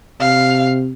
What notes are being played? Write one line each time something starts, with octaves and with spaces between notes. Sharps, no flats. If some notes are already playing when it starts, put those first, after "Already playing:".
C3 F5